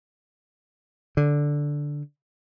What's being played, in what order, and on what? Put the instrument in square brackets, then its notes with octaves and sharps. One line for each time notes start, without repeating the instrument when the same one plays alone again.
[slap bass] D3